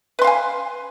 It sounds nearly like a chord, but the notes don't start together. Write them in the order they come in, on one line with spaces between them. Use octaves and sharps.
B4 C6 F5 G#5